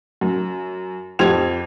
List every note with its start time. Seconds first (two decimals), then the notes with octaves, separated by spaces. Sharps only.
0.21 F#2
1.19 F2 G4 C5 G#6 F7